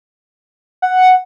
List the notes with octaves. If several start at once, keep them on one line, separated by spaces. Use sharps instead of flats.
F#5